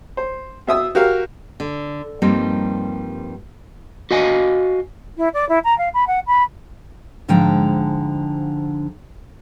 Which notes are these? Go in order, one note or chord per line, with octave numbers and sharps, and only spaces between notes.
C5
B2 E5 D#6 E6
F#4 G4 A#4 F5
D3
G2 F3 G3 A#3 C4 D#4
F#4 D#5 F5 G#5
E4
D5
E4
A#5
F5
B5
F#5
B5
G#2 D3 F3 G#3 G5 A#5